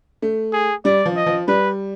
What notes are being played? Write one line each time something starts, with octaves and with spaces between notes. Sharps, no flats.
A3
G#4
G3 D5
F3
D#5
F3
G3 B4